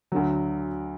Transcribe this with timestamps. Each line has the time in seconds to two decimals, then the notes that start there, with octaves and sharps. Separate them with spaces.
0.12 D2 D3 F#3